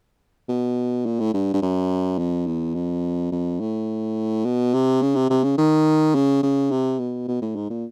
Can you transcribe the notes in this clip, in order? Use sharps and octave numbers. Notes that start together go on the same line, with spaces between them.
B2
A#2
A2
G2
G2
F#2
F2
E2
F2
F2
A2
B2
C3
C#3
C3
C3
C#3
D#3
C#3
C#3
C3
B2
B2
A2
G#2
A#2